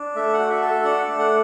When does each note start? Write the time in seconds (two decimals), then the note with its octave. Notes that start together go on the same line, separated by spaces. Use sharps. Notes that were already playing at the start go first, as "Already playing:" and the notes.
Already playing: D4
0.15 A3 E5
0.33 F#5
0.38 F#4
0.50 E5
0.62 A4
0.67 E5
0.84 D4 F#5
1.07 A3
1.19 F#5